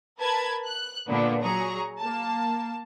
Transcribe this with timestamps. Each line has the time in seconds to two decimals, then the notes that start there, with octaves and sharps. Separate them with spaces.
0.19 A#4 B4 A5 B5 G#6
0.66 F#6
1.07 A#2 D3 A#3 B3 D4
1.42 F#3 G#4 A#5 C#6
1.99 A#3 A5